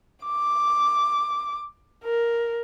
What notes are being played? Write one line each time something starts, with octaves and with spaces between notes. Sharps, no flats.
D6
A#4